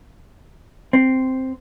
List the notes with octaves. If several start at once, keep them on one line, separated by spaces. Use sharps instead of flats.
C4